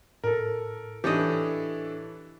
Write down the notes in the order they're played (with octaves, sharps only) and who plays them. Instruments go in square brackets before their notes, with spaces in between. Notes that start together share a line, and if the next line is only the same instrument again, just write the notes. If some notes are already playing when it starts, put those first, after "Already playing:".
[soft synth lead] A2 [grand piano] A4 A#4
[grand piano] E3 [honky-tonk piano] D4 A4 C#5 [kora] G4 D#5